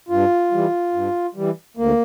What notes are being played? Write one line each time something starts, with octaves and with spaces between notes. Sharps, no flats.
G2 F4
E3 G3
G2
E3 G3
D2 A#3